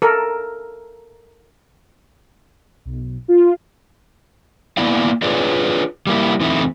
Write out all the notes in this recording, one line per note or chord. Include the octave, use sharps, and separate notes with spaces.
A4 A#4
B1
F4
A#3 B3 E4 D5 F5
D4 F4 G#4 B4 C#5 D5
G3 A#3 E4
E2 E3 A3 C4 D#4 E4